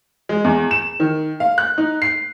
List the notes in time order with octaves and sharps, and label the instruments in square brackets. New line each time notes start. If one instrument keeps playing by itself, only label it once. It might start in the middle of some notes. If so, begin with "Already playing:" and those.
[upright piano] G#3
E2
E7
D#3
F5
F#6
D#4
C7